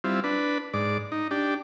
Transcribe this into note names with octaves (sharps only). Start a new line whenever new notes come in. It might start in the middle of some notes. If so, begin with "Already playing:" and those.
G3 C4 E4 F4
D4 B4
G#2 D5
D#4
D4 G4